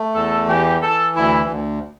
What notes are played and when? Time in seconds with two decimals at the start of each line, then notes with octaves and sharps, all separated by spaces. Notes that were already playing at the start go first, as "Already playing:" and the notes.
Already playing: A3
0.14 E2 A4
0.48 E3 G4
0.82 E3 A4
1.16 D2 E4
1.49 D2